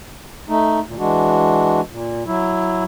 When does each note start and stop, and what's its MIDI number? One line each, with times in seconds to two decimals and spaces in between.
0.49 0.80 57
0.49 0.80 63
0.86 0.95 38
0.86 0.95 46
0.98 1.81 52
0.98 1.81 56
0.98 1.81 62
0.98 1.81 66
1.90 2.23 46
2.26 2.84 54
2.26 2.84 64